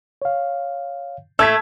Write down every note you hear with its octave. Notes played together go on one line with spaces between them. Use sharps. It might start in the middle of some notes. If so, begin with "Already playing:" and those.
C#5 F5
A3 E6 G#6 B6